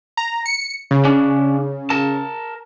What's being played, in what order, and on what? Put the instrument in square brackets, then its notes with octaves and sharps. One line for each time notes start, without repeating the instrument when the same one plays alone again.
[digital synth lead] A#5
C#7
C#3
[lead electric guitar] C#4 D4
A#4 A5